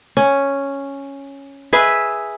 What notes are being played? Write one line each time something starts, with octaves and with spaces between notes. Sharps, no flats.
C#4
G#4 B4 E5